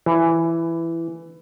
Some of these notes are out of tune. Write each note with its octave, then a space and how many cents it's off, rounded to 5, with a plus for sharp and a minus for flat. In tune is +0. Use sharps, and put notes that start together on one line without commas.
E3 +10